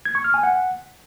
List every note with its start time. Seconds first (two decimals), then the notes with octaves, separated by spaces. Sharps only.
0.05 G#6
0.15 C#6
0.24 F6
0.34 G#5
0.43 F#5